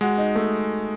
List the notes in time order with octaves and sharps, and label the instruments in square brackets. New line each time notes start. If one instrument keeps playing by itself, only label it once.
[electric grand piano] G#3 [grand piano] F#4
[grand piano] D#4
A3